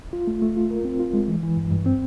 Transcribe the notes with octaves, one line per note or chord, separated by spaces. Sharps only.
F4
A3
A3
F4
A#4
C4
F4
G#3
E3
E3
G2
G2
C4